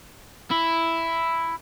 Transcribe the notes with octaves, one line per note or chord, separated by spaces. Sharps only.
E4